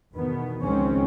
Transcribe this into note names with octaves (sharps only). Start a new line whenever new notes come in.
E2 B2 D#3 B3
C#2 D#3 F3 G#3 C4 C#4